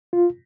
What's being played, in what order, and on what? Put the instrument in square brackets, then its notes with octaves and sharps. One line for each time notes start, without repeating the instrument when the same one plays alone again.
[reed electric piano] F4